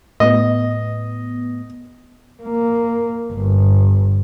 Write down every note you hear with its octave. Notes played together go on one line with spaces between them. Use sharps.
A2 B3 D#5
A#3
G1